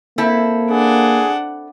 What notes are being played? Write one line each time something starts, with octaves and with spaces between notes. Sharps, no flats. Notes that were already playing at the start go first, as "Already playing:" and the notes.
A#3 C4 E4 A4
D4 G#4 F#5